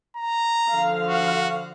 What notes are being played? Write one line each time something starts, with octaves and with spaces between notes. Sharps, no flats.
A#5
D3 F3 F5
F#4